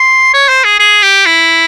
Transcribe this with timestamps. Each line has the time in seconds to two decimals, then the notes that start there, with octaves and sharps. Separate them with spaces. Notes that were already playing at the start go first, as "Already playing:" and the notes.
Already playing: C6
0.34 C#5
0.49 C5
0.64 G#4
0.80 G#4
1.03 G4
1.26 E4